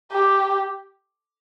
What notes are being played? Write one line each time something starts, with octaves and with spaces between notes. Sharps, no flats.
G4